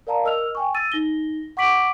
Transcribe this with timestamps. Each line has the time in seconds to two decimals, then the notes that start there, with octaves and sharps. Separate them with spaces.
0.07 A#4 D5 F5 A5 A#5
0.24 A#4 D#5 E6 F6 F7
0.55 G5 G#5 C#6
0.74 E6 A6 D#7
0.92 D#4 A#6 G7
1.57 F#5 C#6 D6 B6 D7 F#7